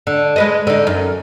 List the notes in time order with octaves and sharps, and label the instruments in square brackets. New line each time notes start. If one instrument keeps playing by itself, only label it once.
[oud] D3
G#3 B4 D#5
D3 D#4
F#2